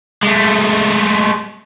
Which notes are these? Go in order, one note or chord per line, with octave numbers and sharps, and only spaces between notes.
G#3 A3